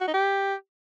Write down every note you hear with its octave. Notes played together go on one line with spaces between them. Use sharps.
F#4
D#4
G4